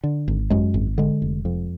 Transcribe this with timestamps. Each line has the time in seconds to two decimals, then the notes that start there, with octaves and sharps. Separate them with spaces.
0.04 D3
0.28 G#1
0.50 F#2 G#3
0.74 G#1
0.98 D3 G#3
1.22 F1
1.45 F2